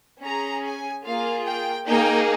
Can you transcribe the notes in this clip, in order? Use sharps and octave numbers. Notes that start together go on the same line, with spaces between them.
C#4 G#4 A#5
G#5
A#3 F4 G#4 F5
G5
A#3 D#4 G#4 G5